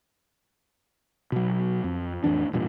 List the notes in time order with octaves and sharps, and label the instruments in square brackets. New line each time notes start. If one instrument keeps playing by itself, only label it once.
[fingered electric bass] B2 F#3
F2
A1 F2 E3 D4
E1 G2 A#2